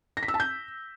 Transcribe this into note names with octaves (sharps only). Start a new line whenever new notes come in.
A#6
B6
E6
A5
G6